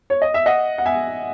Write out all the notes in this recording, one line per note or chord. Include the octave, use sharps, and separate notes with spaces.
C#5
D#5
E5
D#5 F#5
F#5
E5 G#5